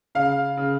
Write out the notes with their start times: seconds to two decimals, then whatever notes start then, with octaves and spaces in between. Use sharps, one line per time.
0.15 C#3 F5
0.57 C#3